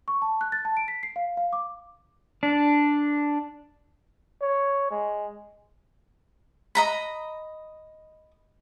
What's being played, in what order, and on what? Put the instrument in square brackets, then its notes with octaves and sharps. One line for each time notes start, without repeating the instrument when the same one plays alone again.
[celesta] C#6
A5
F#6
A6
A5
D7
B6
C7
F5
F5
D6
[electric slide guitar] D4
[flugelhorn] C#5
G#3
[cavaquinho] D#5 A#5 B5